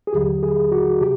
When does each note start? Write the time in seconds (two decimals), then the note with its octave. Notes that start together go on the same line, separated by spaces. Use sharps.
0.07 G#4
0.13 D#2 D3 F#3 G4
0.43 G#4
0.72 F#4
1.01 C3 G4